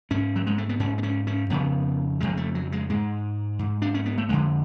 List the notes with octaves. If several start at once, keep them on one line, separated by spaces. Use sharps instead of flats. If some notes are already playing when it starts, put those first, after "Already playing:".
G#2 C#4
F#3
G#3
A3
B3
G#2 C#4
B3
C#4
C#4
F2 C#3 B3
F2 C#3 G#3
A3
F#3
G#3
G#2 G#3
G#2
D4
C#4
B3
A3
F2 D3 G#3